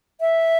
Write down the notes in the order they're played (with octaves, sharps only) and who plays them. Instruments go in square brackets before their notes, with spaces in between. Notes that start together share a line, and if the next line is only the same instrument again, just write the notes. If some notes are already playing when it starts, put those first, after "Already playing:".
[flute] E5